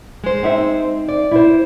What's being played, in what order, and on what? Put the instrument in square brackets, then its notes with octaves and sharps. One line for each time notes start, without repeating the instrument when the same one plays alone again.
[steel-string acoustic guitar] G#3 C5
[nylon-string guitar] C4 D#4 E5
[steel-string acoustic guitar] D5
[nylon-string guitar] E4 C5